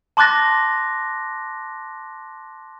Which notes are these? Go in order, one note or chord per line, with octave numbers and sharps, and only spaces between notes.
A5 C6 D6 F#6 A6 A#6